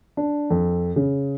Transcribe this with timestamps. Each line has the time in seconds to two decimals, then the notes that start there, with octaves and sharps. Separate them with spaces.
0.17 D4
0.50 F2
0.96 C#3